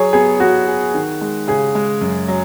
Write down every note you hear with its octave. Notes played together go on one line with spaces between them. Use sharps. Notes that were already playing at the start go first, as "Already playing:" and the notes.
Already playing: F#3 G#4 C#5
B3 G#4
B3 F#4
G#4
D#3
G#3
C#3 G#4
G#3
F#2
F#3